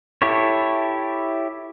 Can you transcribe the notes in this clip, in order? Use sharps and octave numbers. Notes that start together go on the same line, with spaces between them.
E4 G4 A4 C#5